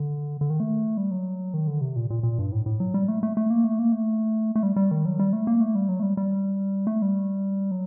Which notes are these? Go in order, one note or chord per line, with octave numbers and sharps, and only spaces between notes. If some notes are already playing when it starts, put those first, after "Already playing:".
Already playing: D3
D3
D#3
A3
G3
F#3
D#3
D3
C3
A#2
A#2
A#2
G2
A2
A2
F#3
G3
A3
A3
A3
A#3
A3
A#3
A3
A3
G3
G3
D#3
F#3
G3
A3
A#3
A3
G3
F#3
A3
G3
G3
A3
G3
F#3